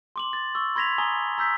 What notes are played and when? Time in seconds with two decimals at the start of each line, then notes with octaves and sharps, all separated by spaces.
0.16 C6 D6 F#7
0.33 A6
0.55 C#6 E6
0.76 B5 C6 G#6 A#6 B6 F7
0.98 G#5 A#5 D#6 G7
1.38 A#5 E6 G6 B6